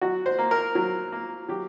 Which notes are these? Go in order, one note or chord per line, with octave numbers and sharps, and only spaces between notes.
F#3 F#4
C5
A#3
A#4
F#3
A#3
F#3 G4